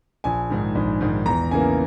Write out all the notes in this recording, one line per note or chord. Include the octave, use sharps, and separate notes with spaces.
A#1 G#5
G#2 D#3
A#1
G#2 D#3
E2 A#5
C#3 E3 A#3 G#5